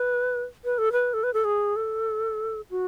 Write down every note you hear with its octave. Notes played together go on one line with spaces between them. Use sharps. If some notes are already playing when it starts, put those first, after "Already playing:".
Already playing: B4
B4
A4
B4
A4
B4
A4
G#4
A4
F#4